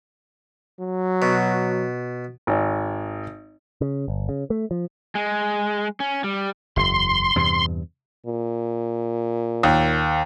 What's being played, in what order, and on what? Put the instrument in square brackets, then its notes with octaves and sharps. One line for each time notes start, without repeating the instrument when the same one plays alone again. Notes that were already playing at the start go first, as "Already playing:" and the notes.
[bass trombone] F#3
[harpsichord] B2
[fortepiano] G#1
[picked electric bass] C#3
G1
C#3
A3
F3
[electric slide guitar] G#3
C#4
G3
[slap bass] F#1 E2 [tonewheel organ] C6
[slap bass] E2 G2 C3
[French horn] A#2
[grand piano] D#2